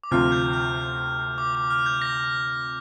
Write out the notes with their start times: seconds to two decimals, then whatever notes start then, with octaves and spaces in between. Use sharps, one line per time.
0.04 D6
0.11 D2 C3 F3 C4 F4 F6
0.32 G6
0.53 F6
1.38 D6
1.55 D6
1.71 F6
1.86 G6
2.02 A#6